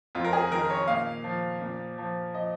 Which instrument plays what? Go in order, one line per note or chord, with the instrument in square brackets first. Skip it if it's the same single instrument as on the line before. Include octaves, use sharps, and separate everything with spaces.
[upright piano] F2 F4
A#4
G#4
D#3 A#4
C#5
A#2 F5
F3
A#2
F3
F3 D#5